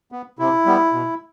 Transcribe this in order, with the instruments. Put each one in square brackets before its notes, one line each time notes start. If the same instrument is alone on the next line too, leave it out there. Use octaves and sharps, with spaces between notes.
[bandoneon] B3
C3 E4
G3 B3
B2